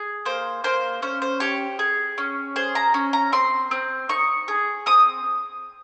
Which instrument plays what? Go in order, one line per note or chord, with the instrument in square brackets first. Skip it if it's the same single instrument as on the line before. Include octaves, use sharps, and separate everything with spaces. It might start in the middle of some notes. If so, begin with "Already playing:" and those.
Already playing: [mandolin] G#4
A#3 C5
A#3 C5
C#4 C5
C5
G4 C#5
G#4
C#4
G#4 C5
A#5
C#4
A#5
C4 C6
C4
D#4 C#6
G#4
C4 D#6